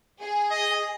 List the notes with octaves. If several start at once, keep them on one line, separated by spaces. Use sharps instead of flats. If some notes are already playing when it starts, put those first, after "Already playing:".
G#4
D#5